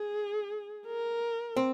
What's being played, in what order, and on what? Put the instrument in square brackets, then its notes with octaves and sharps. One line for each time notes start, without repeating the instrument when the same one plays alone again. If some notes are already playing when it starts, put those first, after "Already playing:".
Already playing: [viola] G#4
A#4
[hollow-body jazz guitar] C4